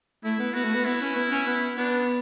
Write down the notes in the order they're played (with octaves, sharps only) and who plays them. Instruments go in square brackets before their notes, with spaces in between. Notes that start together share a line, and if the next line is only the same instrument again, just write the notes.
[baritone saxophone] A3 [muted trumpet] E4
[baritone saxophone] B3
[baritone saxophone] B3 [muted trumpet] F#4
[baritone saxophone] A3
B3
[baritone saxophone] B3 [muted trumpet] E4
[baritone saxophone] C#4
B3
C#4
B3
[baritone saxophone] B3 [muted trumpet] D4